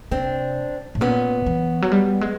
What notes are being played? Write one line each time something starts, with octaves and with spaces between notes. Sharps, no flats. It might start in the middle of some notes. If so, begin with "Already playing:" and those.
C3 C4 D4
A2
A#2 B3 C#4
E3
F#3
G3
G#3